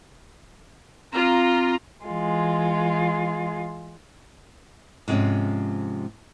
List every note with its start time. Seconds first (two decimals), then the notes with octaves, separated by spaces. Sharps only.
1.13 C4 F4 A#5 D6
2.07 E3 G#3 F4
5.08 G#2 C3 F3 G#3 C#4